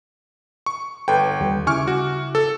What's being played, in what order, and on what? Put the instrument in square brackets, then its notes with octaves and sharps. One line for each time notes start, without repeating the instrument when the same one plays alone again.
[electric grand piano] C#6
[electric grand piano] G1 G5 [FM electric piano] A4 B4
[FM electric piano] D#2 G3
[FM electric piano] C#3 E4 D6 [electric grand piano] G#5 C#6 F6
[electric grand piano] F#4
A4